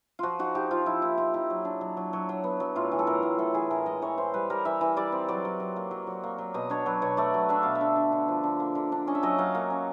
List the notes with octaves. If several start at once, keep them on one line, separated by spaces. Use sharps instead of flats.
F3 F4 F#4
D#4 F#4
D#4 G4
F3 F4
F3 E4
A#3 E4
D#4 F4
D#4 E4
F#3
D4
F#3
F#3
F#3
F#3
B3
F#3
A2 F4
E3
A4
A2 A#4
A2
A2 A4
E3 G#4
A2 A#4
G#3 D#5
E3 C#5
E3 C5
G3 B4
G3 A#4
E3 E5
E3
G3 D5
C4
F#3 D5
F#3
F#3
A#3
F#3
F#3
A#3
F#3
B2 D#5
D4 C#5
F#3 B4
B2 C#5
A3 D5
F#3
D4 E5
B2 F5
E5
D3
D4
D3
F3
D3
A#3
D3
D4
C#4 D#5
E5
F#3 D#5
F#3 F5
A#3
C#4